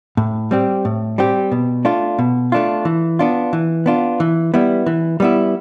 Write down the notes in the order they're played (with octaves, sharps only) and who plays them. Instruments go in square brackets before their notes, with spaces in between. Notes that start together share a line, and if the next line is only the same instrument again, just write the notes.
[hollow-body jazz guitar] A2
G3 C4 G4
A2
G3 C4 G4
B2
A3 D4 F4
B2
A3 D4 F4
E3
B3 D4 F4
E3
B3 D4 F4
E3
G3 B3 E4
E3
G3 B3 E4